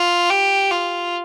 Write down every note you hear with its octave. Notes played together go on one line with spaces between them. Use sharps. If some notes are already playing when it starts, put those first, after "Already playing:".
Already playing: F4
G4
F4